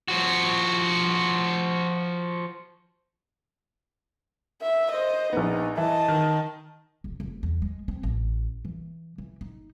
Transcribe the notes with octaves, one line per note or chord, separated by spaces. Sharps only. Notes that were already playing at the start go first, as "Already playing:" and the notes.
F3 F#4
E5
C5 D#5
A#1 B3 D#4
E3 D#5 A5
D#3
F#1
F1
E2
G#3
C4
A1
E3
E3
D#4